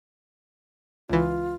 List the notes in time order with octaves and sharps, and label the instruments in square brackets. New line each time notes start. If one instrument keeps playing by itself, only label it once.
[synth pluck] C#2 E3 [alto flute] F4